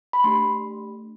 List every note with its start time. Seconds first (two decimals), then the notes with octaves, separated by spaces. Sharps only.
0.13 B5
0.24 A3 D4 G4 C6